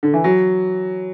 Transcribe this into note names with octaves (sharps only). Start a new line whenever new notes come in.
D3
E3
F#3